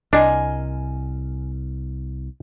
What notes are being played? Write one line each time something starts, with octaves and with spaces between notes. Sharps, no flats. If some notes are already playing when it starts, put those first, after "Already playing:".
C2 D4 A#4 D#5 G#5 C6